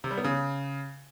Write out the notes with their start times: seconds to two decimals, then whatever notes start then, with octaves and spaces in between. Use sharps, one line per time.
0.04 C3
0.11 G3
0.18 B3
0.24 C#3